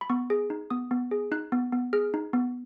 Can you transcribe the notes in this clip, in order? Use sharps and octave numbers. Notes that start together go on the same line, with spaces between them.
B5
B3 C#6
G#4
D#4
B3 D#6
B3
G#4
D#4 F#6
B3
B3
G#4 F6
D#4
B3